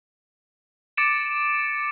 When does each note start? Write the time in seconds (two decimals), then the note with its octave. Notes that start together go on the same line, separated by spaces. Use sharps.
0.97 D6 A6 C#7 D7 E7